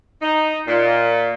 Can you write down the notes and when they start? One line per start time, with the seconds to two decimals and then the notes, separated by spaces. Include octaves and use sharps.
0.22 D#4
0.68 A#2